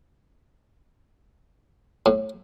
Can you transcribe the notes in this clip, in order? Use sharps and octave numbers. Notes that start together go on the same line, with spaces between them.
A2